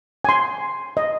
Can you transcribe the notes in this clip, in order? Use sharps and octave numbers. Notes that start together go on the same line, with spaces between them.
G#5 C6
D#5